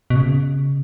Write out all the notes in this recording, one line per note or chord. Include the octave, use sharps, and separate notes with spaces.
B2
C#3